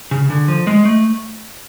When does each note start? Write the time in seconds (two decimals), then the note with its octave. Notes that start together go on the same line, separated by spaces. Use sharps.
0.11 C#3
0.30 D3
0.48 F3
0.67 G#3
0.85 A3